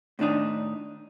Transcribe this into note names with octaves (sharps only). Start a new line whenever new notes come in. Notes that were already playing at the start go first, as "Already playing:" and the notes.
A2 D#3 D4 D#4